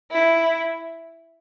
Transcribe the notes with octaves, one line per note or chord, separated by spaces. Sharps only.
E4